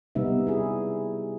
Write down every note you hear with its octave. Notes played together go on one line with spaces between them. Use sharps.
C3 G3 B3 D#4 E5
E4 G#4